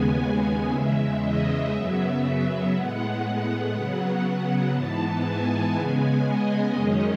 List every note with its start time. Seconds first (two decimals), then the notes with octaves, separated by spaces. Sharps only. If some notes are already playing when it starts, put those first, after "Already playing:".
Already playing: D#2 C#3 G#3 B3 G#5
0.71 E2 C#3 G#3 E5
1.22 D#5
1.73 F#2 C#3 F#3 B3 E5
2.73 A2 G#3 B3 F#5
3.74 C#3 F#3 B3 F#5
4.74 G#2 E3 B3 A5
5.25 G#5
5.75 C#3 G#3 B3
6.25 D#5
6.76 F#2 D#3 G#3 C#4 D#5